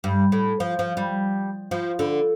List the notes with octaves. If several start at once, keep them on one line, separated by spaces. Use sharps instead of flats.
G2
A2
F3
F3
G3
F3
D3